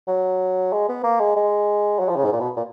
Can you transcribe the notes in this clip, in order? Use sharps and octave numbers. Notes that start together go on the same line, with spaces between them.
F#3
G#3
B3
A#3
G#3
G#3
F#3
F3
C#3
G#2
A#2
B2
A#2